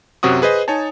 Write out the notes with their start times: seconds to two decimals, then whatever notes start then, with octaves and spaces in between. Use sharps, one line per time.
0.23 F#2 C3 F#3 F#5 C#6 D#6
0.42 G#4 B4 C5 D#5
0.68 D#4 C#5 G#5 A5